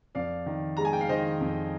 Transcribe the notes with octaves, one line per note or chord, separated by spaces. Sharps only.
F2 D5 F5
D#3
G#3 A#5
G#5
G5
F5
D#3 C5 D#5
F2